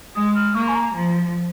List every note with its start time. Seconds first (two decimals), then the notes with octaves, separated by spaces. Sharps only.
0.15 G#3 D#6
0.35 F6
0.55 A#3 C#6
0.68 G#5
0.75 A#5
0.95 F3